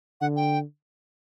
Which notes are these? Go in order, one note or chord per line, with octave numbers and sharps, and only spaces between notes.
D3 F#5
G5